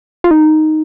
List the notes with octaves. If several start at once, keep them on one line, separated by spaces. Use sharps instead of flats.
F4
D#4